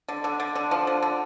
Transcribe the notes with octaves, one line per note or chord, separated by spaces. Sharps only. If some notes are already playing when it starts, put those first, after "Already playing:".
D3
D3
D3
D3
F3
D3
D3